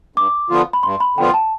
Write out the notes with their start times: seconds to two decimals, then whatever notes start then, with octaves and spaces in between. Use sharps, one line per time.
0.16 G2 D6
0.50 D3 F3 B3 F4
0.73 B5
0.83 G2 C6
1.00 B5
1.17 D3 F3 B3 F4 G5
1.34 A5